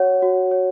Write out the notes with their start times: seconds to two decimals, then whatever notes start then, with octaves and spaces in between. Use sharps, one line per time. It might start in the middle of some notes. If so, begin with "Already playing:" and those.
Already playing: F#4 C#5 F#5
0.22 F#4
0.51 C#5